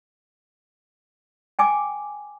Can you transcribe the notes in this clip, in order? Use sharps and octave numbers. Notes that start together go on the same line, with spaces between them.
G5 G#5 D6